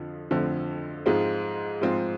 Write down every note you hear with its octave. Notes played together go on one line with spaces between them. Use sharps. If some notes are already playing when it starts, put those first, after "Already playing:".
Already playing: F2 D3 F3
F2 D3 F3 A3 C4
G#2 F3 G#3 C4 F4
G#2 F3 G#3 C4 F4